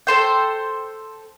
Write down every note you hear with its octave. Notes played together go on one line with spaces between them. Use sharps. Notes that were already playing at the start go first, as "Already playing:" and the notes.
A4 C5 G5